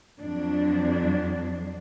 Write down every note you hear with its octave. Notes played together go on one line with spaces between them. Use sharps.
F2 F#3 D4